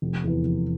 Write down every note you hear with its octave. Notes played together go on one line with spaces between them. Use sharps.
F1
E2 E3
F1